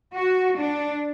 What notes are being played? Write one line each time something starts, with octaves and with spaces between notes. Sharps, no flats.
F#4
D4